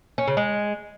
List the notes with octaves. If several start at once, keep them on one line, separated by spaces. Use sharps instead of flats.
C#4
C#3
G#3